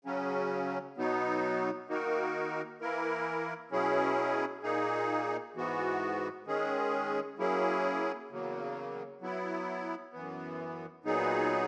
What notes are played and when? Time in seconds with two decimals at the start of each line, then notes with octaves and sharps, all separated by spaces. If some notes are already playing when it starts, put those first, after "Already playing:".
0.05 C#3 F#3 C#4
0.97 B2 F#3 B3 D#4
1.88 D#3 A#3 D#4 F#4 A#4
2.81 E3 A#3 E4 A#4
3.71 B2 F#3 C#4 E4 G#4
4.63 A#2 A#3 D#4 G#4
5.55 G#2 E3 B3 F#4
6.47 D#3 G#3 C#4 G#4
7.38 F#3 A#3 C#4 E4 G#4
8.30 E2 C#3 F#3 A#3
9.21 F#3 B3 E4
10.13 F#2 E3 B3
11.04 A#2 F#3 B3 D#4 G#4